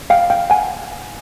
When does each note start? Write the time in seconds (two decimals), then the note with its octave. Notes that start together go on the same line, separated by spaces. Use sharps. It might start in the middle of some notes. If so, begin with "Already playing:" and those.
0.10 F5 G5
0.30 F5 G5
0.50 F#5 G#5